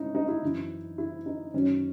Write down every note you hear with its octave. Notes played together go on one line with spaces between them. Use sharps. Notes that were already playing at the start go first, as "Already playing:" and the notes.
Already playing: G#2 C#4 D#4 E4
D#4
E4
F#2 E3
E4
D#4
F#2 D#3 F#3 C#4